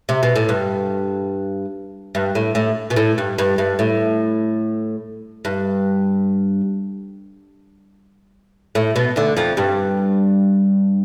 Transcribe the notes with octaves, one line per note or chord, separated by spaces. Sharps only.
C3
B2
A2
G2
G2
A2
A2
B2
A2
G2
G2
G2
A2
G2
A2
B2
D2 D3
F2 F3
G2 G3